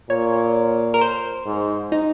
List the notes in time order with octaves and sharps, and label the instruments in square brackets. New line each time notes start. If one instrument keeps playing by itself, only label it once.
[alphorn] A#2 [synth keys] C#5
[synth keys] A#4
C5
[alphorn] G#2
[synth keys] D#4